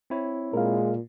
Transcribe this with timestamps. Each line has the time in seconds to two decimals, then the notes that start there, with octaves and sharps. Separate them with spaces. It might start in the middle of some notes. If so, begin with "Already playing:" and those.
0.10 C4 E4 C#5
0.54 A#2 G#3 A#4 F5